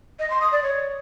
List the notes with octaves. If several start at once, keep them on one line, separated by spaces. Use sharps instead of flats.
D#5
C6
D#6
D5
C#5